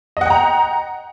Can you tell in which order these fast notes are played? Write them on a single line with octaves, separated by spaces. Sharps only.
D#5 F#5 G5 A#5